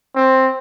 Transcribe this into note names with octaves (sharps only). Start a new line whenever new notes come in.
C4